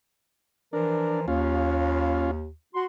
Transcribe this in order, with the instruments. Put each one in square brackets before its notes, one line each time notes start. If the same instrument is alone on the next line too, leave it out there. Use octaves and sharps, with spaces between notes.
[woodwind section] E3 F3 A#4 [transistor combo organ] D4
[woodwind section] D#2 [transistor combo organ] C#4 F4
[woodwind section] F#4 C6